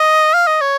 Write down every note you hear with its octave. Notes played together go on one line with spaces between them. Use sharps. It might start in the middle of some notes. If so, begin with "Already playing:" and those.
Already playing: D#5
F5
D#5
C#5